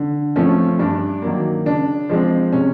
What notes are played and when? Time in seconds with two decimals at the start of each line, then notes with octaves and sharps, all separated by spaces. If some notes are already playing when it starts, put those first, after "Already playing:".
Already playing: D3
0.36 F3 A3 C4 C#4
0.79 G2 D4
1.22 D#3 F#3 A#3
1.66 C#3 D4
2.09 F3 G#3 C4
2.52 C3 C#4